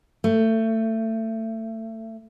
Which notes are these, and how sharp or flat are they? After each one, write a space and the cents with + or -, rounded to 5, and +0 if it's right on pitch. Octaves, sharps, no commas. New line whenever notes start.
A3 +25